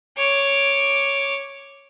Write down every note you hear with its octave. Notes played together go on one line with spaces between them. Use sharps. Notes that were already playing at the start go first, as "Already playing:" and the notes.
C#5 D6